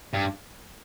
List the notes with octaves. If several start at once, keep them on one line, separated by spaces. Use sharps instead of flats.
G2